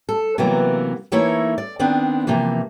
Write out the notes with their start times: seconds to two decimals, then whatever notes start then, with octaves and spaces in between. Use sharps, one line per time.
0.09 A4
0.38 C3 E3 F#3 A#3 B3
1.12 E3 A3 A#3 D#4 E4 C#5
1.58 D5
1.79 D#3 B3 C4 D4
2.27 C3 E3 F3 A#3